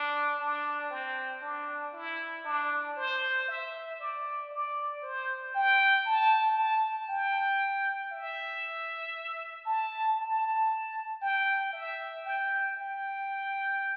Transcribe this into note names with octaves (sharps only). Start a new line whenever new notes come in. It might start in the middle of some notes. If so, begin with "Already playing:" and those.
Already playing: D4
D4
C4
D4
E4
D4
C5
E5
D5
D5
C5
G5
A5
A5
G5
E5
A5
A5
G5
E5
G5
G5